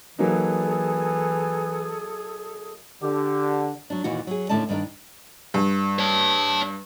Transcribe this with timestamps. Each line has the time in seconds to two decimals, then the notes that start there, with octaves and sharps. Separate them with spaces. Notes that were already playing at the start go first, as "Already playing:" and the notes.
0.19 E3 F#3 A#3 D#4 G#4 A4 D#6
3.02 D3 G4
3.90 F#3 D4
4.04 D#2 A#2 E3 F#4
4.27 F#3 G#4
4.49 D#2 A2 D3 C#4 D5 A5
4.69 G2 D#3 D4 A#4
5.54 G2
5.99 C#5 A5